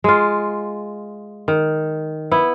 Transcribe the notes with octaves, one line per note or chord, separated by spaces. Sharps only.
G#3 F4
D#3
B3 E4